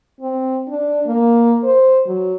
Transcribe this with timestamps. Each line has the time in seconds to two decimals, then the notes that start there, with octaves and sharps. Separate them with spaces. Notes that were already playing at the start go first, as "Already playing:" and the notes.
0.20 C4
0.68 D4
1.07 A#3
1.64 C5
2.06 F#3